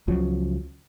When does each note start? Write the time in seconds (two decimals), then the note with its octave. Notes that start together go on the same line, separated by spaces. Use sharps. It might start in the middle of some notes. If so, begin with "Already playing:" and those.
0.08 C#2 C#3 F3 F#3